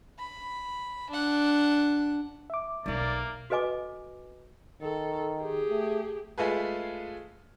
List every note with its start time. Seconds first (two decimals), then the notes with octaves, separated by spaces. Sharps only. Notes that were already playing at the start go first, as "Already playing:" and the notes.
0.19 B5
1.10 D4 F#5
2.50 E5 D6
2.86 B1 A#3 D#4 D5
3.50 F#4 A4 B4 D#5 G#5 D6
4.82 D#3 A4
5.40 G4 G#4
5.70 A3
6.38 G#3 A3 F4 G#4 B4